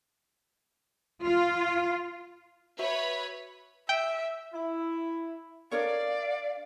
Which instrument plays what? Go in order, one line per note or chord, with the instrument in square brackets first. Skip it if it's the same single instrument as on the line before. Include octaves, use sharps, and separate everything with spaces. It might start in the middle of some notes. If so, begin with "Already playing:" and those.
[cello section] F4
[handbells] F#4 E5 [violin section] B4 C#5 B5
[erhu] E5 [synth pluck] G5
[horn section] E4
[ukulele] D4 A#4 C#5 [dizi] D5 [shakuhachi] F5